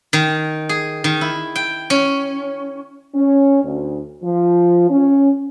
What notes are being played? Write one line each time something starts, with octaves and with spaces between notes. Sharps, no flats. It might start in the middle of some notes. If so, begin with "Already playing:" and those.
D#3
G#4
D#3
E4
G5
C#4
C#4
D2
F3
C#4